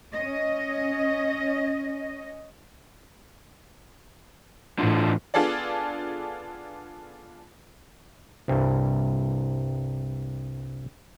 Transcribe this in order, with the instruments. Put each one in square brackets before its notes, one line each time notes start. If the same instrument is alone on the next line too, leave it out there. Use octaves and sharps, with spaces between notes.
[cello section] C#4 D#5
[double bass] A2 E3 [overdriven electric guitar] D3 F3
[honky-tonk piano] B3 D4 F4 G#4 A4 D5
[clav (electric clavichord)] C2 G2